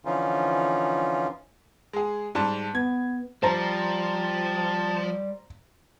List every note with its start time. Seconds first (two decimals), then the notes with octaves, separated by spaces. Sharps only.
0.05 D3 E3 F3 C#4 D#4 F4
1.93 G#3 G#4
2.35 G#2 G3 A5
2.75 B3 G#6
3.43 F3 G3 C5 A5 A#5